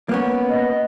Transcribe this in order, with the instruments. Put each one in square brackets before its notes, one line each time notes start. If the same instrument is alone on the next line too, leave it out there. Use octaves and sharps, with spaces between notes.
[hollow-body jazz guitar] A#3 B3 C#4
[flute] D#5